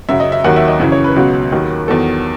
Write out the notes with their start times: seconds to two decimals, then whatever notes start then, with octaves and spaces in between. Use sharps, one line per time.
0.09 F#2 C#3 F#3 E5
0.20 D#5
0.32 E5
0.44 D#2 D#3 F#3 F#5
0.56 E5
0.68 D#5
0.80 F#2 C#3 E3
0.92 C#5
1.04 B4
1.16 C#2 B2 F#3
1.52 D#2 D#3 F#3
1.88 E2 D#3 F#3 A4